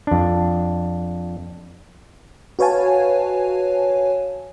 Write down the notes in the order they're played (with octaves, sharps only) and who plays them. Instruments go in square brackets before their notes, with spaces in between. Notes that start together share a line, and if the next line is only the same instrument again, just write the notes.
[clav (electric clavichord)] F2 D4
[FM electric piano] F#4 B4 C#5 F5 G#5 A5